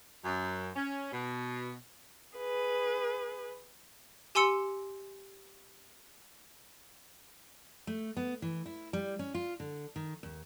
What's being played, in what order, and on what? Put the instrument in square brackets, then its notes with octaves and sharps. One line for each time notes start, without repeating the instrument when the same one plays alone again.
[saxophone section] F#2
C#4
B2
[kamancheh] G#4 B4
[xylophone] G4 G#5 C6 E6 C#7
[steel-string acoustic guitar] A3
B3
E3
E4
G3
C#4
F4
D3
D#3
D#2